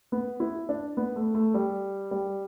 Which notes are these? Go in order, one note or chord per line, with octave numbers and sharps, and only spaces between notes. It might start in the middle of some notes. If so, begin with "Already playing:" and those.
B3
E4
D4
B3
A3
A3
G3
G3